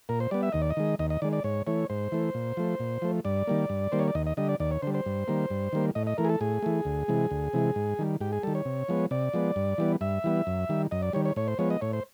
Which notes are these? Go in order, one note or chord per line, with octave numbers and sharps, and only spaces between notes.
A#2 A#4
C5
G3 B3 D5
E5
D#2 D#5
D5
D#5
D#3 G#3
D#2 D#5
D#5
D#3 G#3 D5
D5
G#2 C#5
E3 A3 C#5
G#2 C5
E3 A3
A#2
F3 A3
A#2
F3 A3
G2 D5
D#3 G3 A#3
G2
D#3 G3 A#3 C5
C#5
D5
D#2 D#5
D#5
D3 G3 D#5
D5
D#2 D5
C#5
D3 G3 C5
C5
G2
D#3 G3 A#3
G2
D#3 G3 A#3
A2 D#5
D#5
E3 A3 A#4
G#4
A4
A2 G#4
E3 A3
D2
C3 E3 G#3
D2
C3 E3 G#3
G#2
D#3 G3
G#2 G4
G#4
D#3 G3 A4
C#5
C3
F3 G#3 B3
C3 D5
F3 G#3 B3
G2
E3 G3 B3
G2 E5
E3 G3 B3
F#2
D#3 G3
F#2 D#5
D5
D#3 G3 C#5
C#5
A2 C#5
C5
F3 G#3 B3 C#5
D#5
A2 C#5
C5